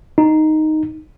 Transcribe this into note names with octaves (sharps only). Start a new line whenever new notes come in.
D#4